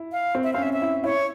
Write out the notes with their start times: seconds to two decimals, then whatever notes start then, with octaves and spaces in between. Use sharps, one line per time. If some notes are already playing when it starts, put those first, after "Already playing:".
Already playing: E4
0.12 F5
0.35 C4
0.44 E5
0.53 C4 F5
0.58 C#4
0.63 E5
0.73 E5
0.82 E4
1.04 E4 C#5